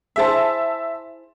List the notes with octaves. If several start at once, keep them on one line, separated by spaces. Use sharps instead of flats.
E4 G#4 C5 E5 A5